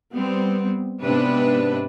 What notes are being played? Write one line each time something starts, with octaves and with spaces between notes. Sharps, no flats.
G3 B3 C4
G#2 C3 B3 D4 B4